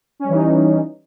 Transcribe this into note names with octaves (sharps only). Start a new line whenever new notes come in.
E3 G3 C#4 D#4